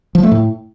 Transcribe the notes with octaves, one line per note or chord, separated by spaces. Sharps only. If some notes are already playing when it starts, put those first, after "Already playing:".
F3
A3
A2